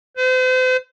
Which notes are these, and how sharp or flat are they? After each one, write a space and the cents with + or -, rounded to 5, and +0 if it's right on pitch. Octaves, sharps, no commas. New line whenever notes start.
C5 -40